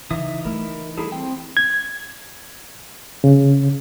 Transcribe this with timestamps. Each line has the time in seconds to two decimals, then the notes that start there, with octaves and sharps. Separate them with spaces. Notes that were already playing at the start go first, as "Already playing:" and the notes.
0.11 C#3 E3 D#4 E5 D#6
0.45 A3 E4 A#4
0.97 G3 E4 G#4 A4
1.12 C4 G5
1.57 G#6
3.24 C#3